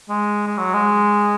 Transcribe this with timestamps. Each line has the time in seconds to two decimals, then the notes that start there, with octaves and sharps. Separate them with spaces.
0.09 G#3
0.47 G#3
0.58 F#3
0.74 G#3